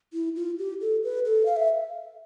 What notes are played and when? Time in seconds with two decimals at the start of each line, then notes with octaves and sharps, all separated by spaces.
0.13 E4
0.36 F4
0.59 G4
0.81 A4
1.04 B4
1.25 A4
1.46 F5
1.56 E5